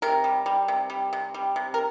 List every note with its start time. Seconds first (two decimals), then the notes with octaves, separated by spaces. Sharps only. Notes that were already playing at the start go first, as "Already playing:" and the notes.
0.02 C3 A#4
0.24 G3
0.46 G3
0.68 C3
0.90 G3
1.13 C3
1.34 G3
1.56 C3
1.74 A#4